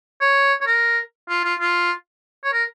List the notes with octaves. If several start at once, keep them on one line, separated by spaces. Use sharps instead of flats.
C#5
C#5
A#4
F4
F4
F4
C#5
A#4